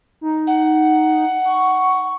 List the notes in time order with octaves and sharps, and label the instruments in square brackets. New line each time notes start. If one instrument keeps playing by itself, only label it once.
[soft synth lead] D#4
[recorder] F#5
[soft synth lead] C#6